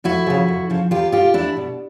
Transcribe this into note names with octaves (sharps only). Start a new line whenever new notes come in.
F2 E4 F#4
C#3 F3
F2
C#3 F3
E2 F4 G4
B2 F4 G4
E2 D4 E4
B2